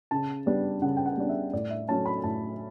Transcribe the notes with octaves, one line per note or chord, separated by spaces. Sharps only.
C#3 A5
G3 B3 D4
C#3 F#5
G5
F#5
G3 B3 D4
E5
A2 D5
E5
F#3 A3 C#4 A5
B5
A2 A5